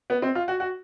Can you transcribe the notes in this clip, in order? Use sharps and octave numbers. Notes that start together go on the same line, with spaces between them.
B3
C4
F4
F#4
F#4